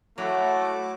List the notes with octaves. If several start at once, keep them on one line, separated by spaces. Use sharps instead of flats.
F#3 A3 E4 F#4 F#5 D6